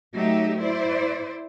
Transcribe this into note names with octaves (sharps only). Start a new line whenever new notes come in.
F#3 A3 D#4 G4 E5
E4 C5 D5